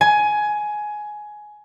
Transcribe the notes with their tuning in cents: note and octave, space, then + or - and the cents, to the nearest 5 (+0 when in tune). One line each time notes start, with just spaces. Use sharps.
G#5 +15